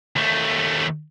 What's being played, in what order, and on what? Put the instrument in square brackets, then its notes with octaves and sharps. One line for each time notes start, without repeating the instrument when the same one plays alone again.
[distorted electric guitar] D#2 A3